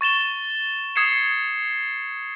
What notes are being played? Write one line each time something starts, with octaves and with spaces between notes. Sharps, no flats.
C#6 A6 E7 G7
D#6 G#6 C7 C#7 E7